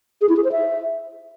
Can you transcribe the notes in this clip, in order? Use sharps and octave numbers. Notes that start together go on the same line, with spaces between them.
G#4
E4
G#4
C5
E5